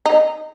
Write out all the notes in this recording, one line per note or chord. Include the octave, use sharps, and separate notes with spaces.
D#4